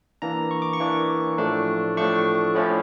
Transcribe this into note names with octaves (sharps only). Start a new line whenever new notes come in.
E3 A#3 D4 A#5
C#6
D6
C#6
E3 A#3 D4
A2 F3 A3 D4
A2 F3 A3 D4 C#6
A2 F3 C#4 E4 D5